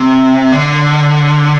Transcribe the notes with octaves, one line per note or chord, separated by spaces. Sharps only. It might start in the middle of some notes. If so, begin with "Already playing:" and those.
Already playing: C3
D3